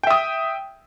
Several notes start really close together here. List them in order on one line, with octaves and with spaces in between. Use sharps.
G5 E5 D#6